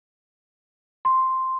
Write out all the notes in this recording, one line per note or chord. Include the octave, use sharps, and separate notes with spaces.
C6